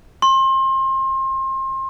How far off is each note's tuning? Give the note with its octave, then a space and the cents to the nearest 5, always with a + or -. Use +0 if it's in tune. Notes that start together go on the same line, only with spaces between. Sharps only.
C6 +30